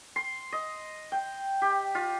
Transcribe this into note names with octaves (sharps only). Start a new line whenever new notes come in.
C6
D#5
G5
G4
F4